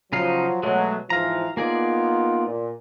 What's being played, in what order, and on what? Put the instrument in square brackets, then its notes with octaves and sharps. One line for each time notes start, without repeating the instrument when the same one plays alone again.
[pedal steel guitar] C#3 D#4 F5 [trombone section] F3 F#3
[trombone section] B2 F#3 [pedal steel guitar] G#3 A3
[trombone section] G#2 E3 F3 [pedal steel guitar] F5 A#5
[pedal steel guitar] A#3 G#4 D5 [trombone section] B3 D#4 F4
[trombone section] A#2